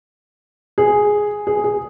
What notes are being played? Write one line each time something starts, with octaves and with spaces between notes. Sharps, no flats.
G#4
G#4
G#4